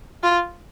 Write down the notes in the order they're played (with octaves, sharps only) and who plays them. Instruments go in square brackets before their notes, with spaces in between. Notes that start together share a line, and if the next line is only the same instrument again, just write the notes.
[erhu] F4